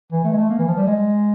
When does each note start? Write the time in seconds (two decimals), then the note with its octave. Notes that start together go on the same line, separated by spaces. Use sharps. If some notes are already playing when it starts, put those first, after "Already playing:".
0.12 E3
0.24 A3
0.32 G#3
0.37 A3
0.49 A#3
0.59 E3
0.68 F3
0.77 G3
0.87 G#3